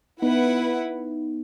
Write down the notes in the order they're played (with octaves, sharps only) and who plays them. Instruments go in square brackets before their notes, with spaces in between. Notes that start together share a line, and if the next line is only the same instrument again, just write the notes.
[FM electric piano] B3 D#4 [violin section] E4 B4 F#5